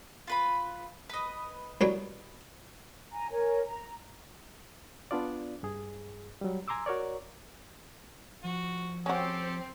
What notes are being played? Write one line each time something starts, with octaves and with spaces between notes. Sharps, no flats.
F4 B4 B5
B4 D#5
C2 F#3 G3
G#5 A#5
A#4 C#5 G#5
A#5
B3 D4 F4 D5
G2 G#4
F#3 G3
G#5 A#5 C6 D6 E6
F#4 A#4 C#5 D5
F3 F#4
C4 C#4 F#4 G4 A4